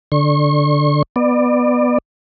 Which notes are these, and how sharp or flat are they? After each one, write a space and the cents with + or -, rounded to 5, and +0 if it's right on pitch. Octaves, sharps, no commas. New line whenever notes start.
D3 +0 C#6 -40
B3 +0 D5 +30